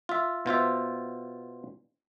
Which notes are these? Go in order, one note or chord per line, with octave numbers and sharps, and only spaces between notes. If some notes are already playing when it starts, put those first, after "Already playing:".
F4 E5
B2 F4 C5 E5